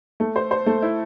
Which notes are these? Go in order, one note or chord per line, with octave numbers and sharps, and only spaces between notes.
A3
C5
C5
A3
E4